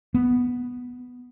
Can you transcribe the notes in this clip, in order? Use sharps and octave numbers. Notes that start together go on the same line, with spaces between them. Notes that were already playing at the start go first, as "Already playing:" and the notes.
B3